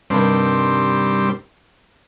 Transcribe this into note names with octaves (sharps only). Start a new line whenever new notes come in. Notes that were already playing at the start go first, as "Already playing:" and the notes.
G2 C3 D#3 G3 C4